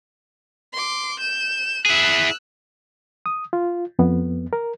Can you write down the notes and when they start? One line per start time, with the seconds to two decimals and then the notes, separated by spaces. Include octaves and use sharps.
0.73 C6 D6
1.20 G6 E7
1.86 E4 G#4 E6 F#6
3.26 D#6
3.53 F4
3.99 F2 B3
4.53 A#4